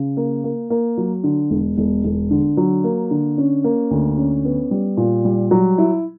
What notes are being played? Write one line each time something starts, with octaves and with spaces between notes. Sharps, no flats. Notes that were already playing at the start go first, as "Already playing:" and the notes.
Already playing: C#3
A#3
A#3
A#3
F#3
D3
E1
E1
E1
D3
F#3
A#3
D3
C#4
A#3
D2
C#4
B3
G3
A#2
G3
F#3
E4